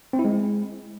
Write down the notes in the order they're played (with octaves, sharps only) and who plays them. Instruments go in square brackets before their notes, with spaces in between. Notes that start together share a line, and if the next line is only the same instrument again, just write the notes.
[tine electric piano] C4
E4
G#3